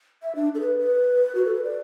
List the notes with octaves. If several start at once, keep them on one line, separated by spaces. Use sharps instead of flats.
E5
D4
A4
B4
B4
F#4
A4
B4
D5